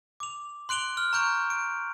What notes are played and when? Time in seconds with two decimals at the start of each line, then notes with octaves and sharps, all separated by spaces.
0.20 D6 F7
0.69 C6 F#6 D7 F7 G7
0.97 F6 G7
1.13 A#5 C#6 G6 D7 F7
1.50 D7